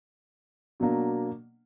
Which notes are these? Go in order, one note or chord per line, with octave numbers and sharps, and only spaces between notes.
B2 F#3 A#3 D4